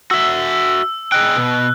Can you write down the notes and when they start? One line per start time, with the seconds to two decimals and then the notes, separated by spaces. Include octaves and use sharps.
0.11 F#4 E5 E6
1.12 G#4 D#5 G5 F#6
1.36 B2